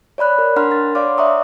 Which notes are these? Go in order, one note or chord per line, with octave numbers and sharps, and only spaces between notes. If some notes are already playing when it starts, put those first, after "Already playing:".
C#5 D5 B5 F#6
A#4
D4 A#4 F#5 A#5 C6 F6
A6
C#5 D5 F5 C6 D6 F6
D5 E5 F#5 A#5 C#6 D#6